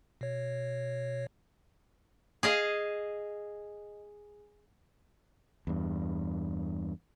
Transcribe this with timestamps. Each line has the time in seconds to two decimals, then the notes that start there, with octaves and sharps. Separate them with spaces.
0.21 B2 C#5
2.43 G#4 D#5 F5
5.67 E2 G2